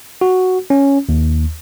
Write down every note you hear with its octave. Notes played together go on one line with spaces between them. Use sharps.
F#4
C#4
D#2